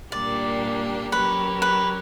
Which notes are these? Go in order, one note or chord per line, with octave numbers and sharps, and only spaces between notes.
A#2 G3 A#3 D4 G4 D5
F#3 C#4 G4 A#4 B4
B4